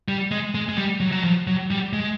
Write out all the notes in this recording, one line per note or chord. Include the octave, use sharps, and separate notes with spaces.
G3
G#3
G#3
G#3
G3
F#3
F#3
F3
F#3
G3
G#3